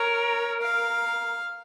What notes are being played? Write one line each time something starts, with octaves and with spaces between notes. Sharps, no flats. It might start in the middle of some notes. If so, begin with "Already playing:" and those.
Already playing: A#4 C#5
F5